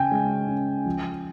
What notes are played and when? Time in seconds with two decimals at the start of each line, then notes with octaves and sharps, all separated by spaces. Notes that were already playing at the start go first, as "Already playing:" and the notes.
Already playing: C#3 C#4 G5 G#5
0.12 G#3
0.48 C#4
0.85 F3